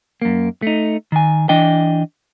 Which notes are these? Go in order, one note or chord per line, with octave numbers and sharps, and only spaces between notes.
F#2 A#3
A3 D#4
D#3 G#5
E3 D4 D#5 G5